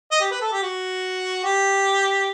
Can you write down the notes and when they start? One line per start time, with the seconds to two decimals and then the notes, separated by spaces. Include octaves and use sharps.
0.11 D#5
0.21 G4
0.31 B4
0.42 A4
0.52 G4
0.63 F#4
1.44 G4